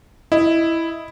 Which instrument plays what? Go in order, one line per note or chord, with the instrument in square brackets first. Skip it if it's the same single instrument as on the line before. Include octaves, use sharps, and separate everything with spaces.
[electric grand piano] E4 [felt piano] D#5